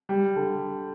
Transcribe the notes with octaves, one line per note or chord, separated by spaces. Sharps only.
G3
D3